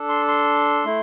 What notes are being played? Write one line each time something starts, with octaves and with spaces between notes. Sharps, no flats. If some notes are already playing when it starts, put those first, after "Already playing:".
Already playing: D4 A4
C6
C6
A3 E4